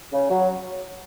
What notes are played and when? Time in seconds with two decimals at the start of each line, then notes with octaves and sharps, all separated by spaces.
0.12 C#3
0.30 F#3